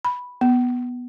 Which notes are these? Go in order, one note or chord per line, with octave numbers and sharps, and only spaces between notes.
B5
B3